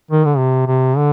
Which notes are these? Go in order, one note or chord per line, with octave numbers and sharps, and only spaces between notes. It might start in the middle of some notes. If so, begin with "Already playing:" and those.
D#3
D3
C3
C3
D3